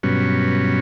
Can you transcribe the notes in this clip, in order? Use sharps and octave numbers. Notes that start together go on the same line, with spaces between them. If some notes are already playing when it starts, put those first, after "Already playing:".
G2 B2 F#3 C#4